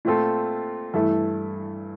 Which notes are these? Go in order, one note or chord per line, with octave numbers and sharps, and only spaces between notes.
A#2 A3 C4 F4 A4
G2 E3 A3 E4 A4